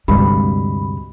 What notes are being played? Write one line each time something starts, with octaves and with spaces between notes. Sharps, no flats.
D2 G2 C3 G#3 B5